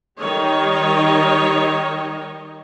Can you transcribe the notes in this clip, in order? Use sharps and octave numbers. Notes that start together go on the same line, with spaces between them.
D#3 G3 C#5 D#5